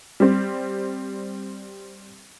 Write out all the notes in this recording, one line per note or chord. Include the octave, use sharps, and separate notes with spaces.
G3 C4